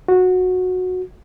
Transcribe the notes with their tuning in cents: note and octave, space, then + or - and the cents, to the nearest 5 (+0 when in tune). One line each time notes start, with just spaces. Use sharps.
F#4 -15